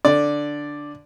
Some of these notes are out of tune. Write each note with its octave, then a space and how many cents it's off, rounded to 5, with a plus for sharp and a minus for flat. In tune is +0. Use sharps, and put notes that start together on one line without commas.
D3 +0 D5 +0